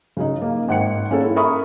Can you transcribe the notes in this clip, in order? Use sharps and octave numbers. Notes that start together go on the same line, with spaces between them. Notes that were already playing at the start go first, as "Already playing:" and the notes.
C#3 F#3 D#4
A#3
G#1 F#5 G5 C#7
A#3 C#4 G#4 A4
E4
A4 A#4 E5 B5 C#6 D#6